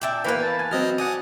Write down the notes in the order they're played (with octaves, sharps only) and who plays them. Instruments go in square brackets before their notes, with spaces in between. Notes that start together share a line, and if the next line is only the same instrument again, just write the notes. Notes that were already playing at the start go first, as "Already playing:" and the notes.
[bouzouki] A#2 D4 E5 [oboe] G5
[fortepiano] E3 A#3 B3 [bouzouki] B4 F5
[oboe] A5
[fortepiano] G#5
[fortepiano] F#3 [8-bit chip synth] C4 D#5 F6
[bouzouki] D4 [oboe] D#5 [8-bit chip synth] F#5 G#5 D#6